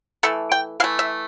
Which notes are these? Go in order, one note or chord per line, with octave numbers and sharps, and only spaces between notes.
E3 A3 A4
G5
E3 A3 F5
E5